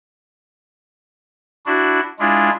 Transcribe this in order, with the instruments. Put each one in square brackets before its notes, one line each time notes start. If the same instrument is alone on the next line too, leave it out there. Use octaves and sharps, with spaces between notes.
[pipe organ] D4 E4 F#4
G#3 D4 E4 F4